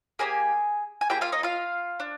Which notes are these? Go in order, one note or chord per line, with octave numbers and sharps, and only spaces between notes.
A#3 D#4 G4 G#4 G#5
G#5
A#3 F4 G4 G#4 G5
F4 F5
D#4 D#5
F4 F5
D4